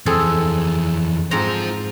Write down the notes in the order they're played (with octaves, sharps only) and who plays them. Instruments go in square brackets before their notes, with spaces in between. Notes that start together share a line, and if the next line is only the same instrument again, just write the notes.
[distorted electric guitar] F2 E3 [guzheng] C4 G#4 A4
[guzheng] G#2 C4 A#5 [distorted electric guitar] F4 C5